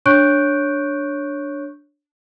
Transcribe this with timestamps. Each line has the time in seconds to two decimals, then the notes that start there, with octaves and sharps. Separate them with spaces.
0.06 D4 C#5 C#6 F#6 G6 D7